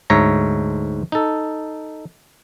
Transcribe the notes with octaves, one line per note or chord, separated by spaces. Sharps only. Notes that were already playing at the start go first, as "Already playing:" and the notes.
D2 G#2 C#5 E5 A#5
D#4 A4